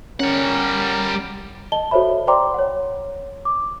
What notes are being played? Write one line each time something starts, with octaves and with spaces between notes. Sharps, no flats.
G3 C#4 A#4 F#5
D#5 A5 G7
F#4 A4 C5 C#5 E5 B5
C5 D5 G5 A#5 C6 D6
C#5 F#5
D6